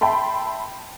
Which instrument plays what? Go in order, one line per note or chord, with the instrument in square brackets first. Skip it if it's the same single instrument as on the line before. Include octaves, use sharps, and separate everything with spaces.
[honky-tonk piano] E5 G5 A5 B5 C6